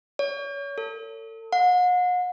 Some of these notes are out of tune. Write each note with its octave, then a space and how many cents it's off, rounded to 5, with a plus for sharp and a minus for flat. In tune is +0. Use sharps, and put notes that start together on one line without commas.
C#5 +30
A4 +35
F#5 -40